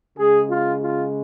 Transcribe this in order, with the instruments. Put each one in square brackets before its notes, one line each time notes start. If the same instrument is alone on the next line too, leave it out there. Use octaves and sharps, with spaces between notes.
[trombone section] C#3 G#3 G#4
F4
F4